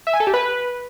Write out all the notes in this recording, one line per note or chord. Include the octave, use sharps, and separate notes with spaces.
E5
G#5
A4
G4
B4